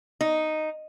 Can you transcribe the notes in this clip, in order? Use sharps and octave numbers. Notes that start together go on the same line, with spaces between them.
D#4